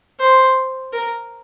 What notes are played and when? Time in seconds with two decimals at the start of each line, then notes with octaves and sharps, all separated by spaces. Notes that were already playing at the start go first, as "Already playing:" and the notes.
0.19 C5
0.93 A#4